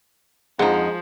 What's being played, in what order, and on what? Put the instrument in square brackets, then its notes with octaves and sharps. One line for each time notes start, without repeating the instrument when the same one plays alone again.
[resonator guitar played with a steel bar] F2 D#4 [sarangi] F3 [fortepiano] G#3 [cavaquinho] F#5